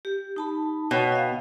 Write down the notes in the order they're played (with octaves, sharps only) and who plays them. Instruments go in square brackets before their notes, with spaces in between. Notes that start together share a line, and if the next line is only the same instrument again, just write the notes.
[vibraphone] G4
D#4 A5 B5
[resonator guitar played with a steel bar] B2 [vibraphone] C#5 G5 C#6
[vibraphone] D#5 F5